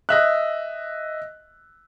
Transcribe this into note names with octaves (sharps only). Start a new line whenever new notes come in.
D#5 E5 F#6